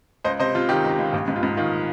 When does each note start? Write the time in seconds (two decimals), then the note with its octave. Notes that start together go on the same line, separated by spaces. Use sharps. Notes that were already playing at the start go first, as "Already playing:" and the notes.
0.24 C#2 C5 D#5
0.39 C3 C5 D#5
0.54 C3 F4
0.69 D#3 G4
0.84 C#2
0.91 G4
0.98 C#2
1.13 A#1 G4
1.28 G#2
1.36 F4
1.43 G#2
1.57 D#3 F4